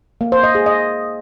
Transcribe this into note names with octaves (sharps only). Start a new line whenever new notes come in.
A#3
C5
D#5
G#4
D#5